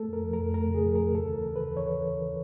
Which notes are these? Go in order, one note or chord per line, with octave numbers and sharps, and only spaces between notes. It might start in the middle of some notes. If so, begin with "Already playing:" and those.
Already playing: A3 A4
F2 A#4
F3
A#4
F2
A3 A#4
C#3 G#4
F3
C#3 A#4
D#2 A4
E3
A#4
C#3
B4
D#2
E3 C#5